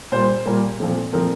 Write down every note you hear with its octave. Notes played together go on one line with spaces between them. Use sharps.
A#2 G3 A#3 C5
A#2 G3 A#3
A#2 F3 A3 C4
A#2 F3 A3 C4 A#4